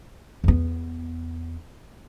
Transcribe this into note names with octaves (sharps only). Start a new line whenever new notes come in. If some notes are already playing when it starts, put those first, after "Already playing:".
E2 B3